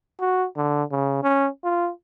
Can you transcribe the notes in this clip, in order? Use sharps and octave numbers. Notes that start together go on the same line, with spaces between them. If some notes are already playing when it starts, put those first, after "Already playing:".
F#4
D3
C#3
C#4
F4